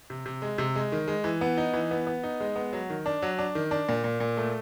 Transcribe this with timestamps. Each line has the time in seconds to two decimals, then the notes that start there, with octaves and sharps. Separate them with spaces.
0.10 C3
0.26 C3
0.42 G#3
0.58 C3
0.76 G#3
0.92 D#3
1.08 G#3
1.24 E3
1.41 B3
1.57 D#4
1.73 E3
1.91 B3
2.07 B3
2.23 D#4
2.40 G#3
2.56 B3
2.73 F#3
2.90 D#3
3.06 D4
3.22 F#3
3.38 D4
3.55 D#3
3.71 D4
3.89 A#2
4.04 A#2
4.20 A#2
4.37 A3